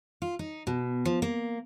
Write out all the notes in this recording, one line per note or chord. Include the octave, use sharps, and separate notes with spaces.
F4
D#4
B2
F3
A#3